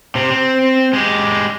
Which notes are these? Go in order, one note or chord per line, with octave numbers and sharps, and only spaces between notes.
C3 C4
C4
G#3 G4